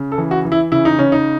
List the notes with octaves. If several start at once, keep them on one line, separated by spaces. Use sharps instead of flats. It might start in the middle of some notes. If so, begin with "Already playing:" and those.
Already playing: C#3
A4
E3
F#4
E3
E4
C#3 E4
D#4
C#3 C#4
D#4